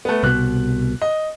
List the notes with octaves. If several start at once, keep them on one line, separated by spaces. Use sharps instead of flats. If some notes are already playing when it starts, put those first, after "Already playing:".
A3 B3
C2 B2 F#6
D#5